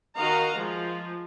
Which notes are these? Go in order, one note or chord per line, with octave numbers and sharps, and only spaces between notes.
D#3 F#4 D#5 F5 A#5
F3 G#3 F4